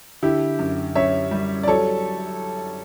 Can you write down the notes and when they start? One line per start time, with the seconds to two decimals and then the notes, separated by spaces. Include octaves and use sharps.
0.22 D3 E4 G4
0.59 F#2
0.95 F#2 C#5 E5
1.31 G3
1.63 D5
1.68 F#3 A4 C#5